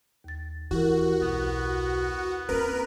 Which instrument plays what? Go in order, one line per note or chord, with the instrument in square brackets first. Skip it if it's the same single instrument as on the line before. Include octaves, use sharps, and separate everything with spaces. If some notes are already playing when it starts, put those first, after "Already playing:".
[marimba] D#2 A6
[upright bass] E3 [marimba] E4 G4 A#4 [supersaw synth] F#4
[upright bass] B1 [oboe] B3
[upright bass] A#3 C4 [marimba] C#4 [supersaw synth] A#4 B4